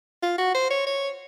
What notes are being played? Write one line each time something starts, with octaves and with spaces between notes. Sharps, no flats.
F4
F#4
C5
C#5
C#5